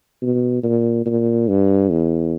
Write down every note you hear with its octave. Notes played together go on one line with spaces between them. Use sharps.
B2
A#2
A#2
G2
E2